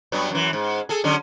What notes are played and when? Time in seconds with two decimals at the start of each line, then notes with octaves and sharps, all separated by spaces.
0.12 G2 F#3 B3
0.31 F#2 E3
0.53 G#2
0.89 G#4 A4
1.04 D3 F#3 C#4